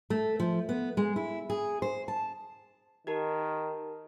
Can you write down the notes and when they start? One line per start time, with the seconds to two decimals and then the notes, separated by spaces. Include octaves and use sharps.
0.10 A3
0.40 F3
0.69 B3
0.97 G#3
1.16 E4
1.50 G#4
1.82 C5
2.08 A5
3.07 D#3 G4 A#4 A5